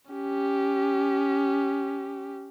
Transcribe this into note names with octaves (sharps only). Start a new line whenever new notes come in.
C#4 G4